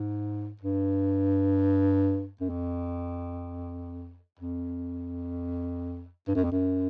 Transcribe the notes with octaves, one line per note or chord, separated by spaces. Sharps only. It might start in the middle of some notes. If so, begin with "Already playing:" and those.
Already playing: G#2
G2
F#2
F2
F2
G2
F#2
F2
F#2